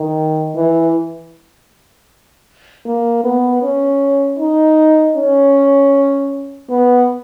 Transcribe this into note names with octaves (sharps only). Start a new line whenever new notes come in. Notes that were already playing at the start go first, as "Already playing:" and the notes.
Already playing: D#3
E3
A#3
B3
C#4
D#4
C#4
B3